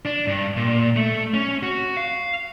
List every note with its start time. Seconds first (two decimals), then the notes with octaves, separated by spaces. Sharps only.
0.05 D4
0.27 G2
0.57 A#2
0.96 A3
1.34 C#4
1.63 F#4
1.97 F5